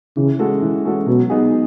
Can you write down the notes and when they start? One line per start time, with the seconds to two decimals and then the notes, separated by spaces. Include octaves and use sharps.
0.17 C#3 E3
0.39 G#3 C#4 F#4 A4
0.62 E3
0.85 G#3 C#4 F#4 A4
1.07 B2 F#3
1.30 B3 D#4 G#4